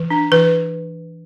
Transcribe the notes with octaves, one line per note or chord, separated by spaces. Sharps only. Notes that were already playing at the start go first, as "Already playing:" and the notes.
Already playing: E3
D4
E3 B4